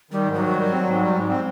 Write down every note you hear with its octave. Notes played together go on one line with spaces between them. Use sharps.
D#3 G3
G#2
F#3
D#3
G3
C4
G#2
G3
G#2
C4